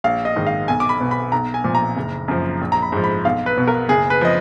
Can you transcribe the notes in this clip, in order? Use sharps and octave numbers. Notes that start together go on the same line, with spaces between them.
A#1 F5
D#5
G#2 D#3
F5
B1 G#5
D6
B5
B2
B5
B1 A#5
G#5
A#2 F3
A#5
F#1
F#2 F3
A#1
A#5
B5
G#2 F3
B5
B1 F5
B4
B2
A#4
F#1 G#4
B4
F3 D#5